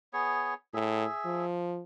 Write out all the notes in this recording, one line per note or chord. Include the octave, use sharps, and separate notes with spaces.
B3 G#4 C#5
A2 G#4 E5
F3